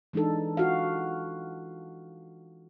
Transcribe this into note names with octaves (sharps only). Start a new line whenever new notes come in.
E3 G#3 D4 D#4 A4
F4 F#4 F5